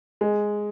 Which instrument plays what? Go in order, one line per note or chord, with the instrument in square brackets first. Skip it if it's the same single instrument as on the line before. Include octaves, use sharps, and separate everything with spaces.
[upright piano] G#3